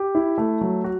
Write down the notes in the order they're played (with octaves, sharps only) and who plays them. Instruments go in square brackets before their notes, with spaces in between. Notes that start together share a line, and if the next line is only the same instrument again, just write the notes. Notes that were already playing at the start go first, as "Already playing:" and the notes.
Already playing: [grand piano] G4
E4
A3
F#3
F#4